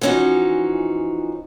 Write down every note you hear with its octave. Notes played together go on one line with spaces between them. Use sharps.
E3 F3 C#4 D#4 F#4